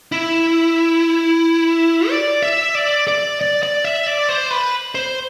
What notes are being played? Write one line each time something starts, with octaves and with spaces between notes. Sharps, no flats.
E4
D5
E5
D5
D5
D5
D5
E5
D5
C5
B4
C5